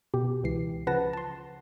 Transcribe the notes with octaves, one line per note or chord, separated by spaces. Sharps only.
B2 G4
C#2 E3 C7
C#3 F3 B4 F#5 A5 A#6
A5 C6